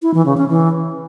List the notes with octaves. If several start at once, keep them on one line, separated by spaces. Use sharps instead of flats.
E4
E3
C#3
C#4
E3